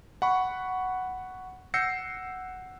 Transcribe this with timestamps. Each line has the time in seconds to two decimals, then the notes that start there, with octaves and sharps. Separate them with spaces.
0.22 F#5 B5 C#6
1.74 F#5 E6 G6 A#6 C7 C#7